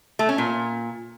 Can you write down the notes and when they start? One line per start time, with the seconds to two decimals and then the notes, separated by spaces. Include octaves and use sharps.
0.19 A3
0.29 C#4
0.38 A#2